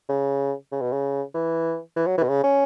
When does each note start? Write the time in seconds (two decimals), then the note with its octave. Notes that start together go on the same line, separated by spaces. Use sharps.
0.09 C#3
0.71 C#3
0.81 B2
0.92 C#3
1.34 E3
1.96 E3
2.07 F#3
2.18 E3
2.23 B2
2.29 C#3
2.44 C#4